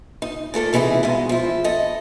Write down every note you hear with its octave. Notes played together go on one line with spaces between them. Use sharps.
D#4
A#2 A3 A4 A#4
C3 E3 D#4 E4 G#4
G2 B2 G#3
F3 E4
A4 D#5